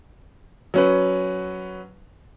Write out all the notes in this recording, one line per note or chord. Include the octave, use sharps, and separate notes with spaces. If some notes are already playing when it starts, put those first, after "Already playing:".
F#3 C#4 B4